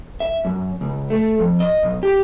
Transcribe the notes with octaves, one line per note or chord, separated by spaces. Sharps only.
E5
F#2
C#2
A3
F2
D#5
B1
G4